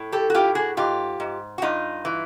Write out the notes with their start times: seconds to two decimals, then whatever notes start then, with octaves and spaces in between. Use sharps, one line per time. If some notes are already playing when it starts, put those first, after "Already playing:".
Already playing: A2
0.12 G4 A4
0.30 F#4
0.34 A2 F4 G4
0.55 F#4 G#4
0.77 G#2 F4 G4
1.20 G#2
1.58 F#4
1.62 G2 D#4 F4
2.05 E3